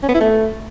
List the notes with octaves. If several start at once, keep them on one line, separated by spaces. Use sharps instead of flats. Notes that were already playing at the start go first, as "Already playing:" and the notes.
C#4
B3
E4
A3